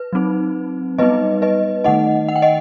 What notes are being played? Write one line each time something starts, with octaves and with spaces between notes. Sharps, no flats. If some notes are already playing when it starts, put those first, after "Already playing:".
Already playing: B4
F#3 C4 D#4
G3 B3 D#4 B4 D#5
B4 D#5
D#3 A3 D#4 D#5 F#5
F#5
G5
D#5 F#5